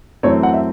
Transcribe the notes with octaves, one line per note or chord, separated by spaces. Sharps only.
F#2 E3 A3 C4 C#5
F#5
E5